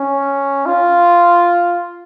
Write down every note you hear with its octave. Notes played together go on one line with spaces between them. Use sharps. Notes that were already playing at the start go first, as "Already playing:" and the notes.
Already playing: C#4
F4